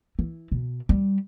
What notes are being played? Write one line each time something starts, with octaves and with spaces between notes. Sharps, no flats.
E3
B2
G3